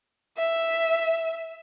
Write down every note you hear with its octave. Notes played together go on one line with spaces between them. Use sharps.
E5